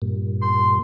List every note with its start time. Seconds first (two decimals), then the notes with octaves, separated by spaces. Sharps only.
0.02 G2 A#2
0.42 C6